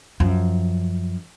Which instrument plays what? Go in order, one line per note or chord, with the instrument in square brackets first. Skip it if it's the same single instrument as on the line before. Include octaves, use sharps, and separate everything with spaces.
[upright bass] F#2 F3